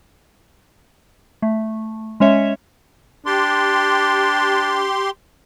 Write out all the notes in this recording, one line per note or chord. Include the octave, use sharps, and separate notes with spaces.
A3
G#3 C#4 C#5 E5
D4 G4 C6